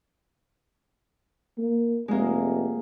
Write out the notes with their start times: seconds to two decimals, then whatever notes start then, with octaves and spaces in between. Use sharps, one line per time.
1.58 A#3
2.08 F1 G#3 A#3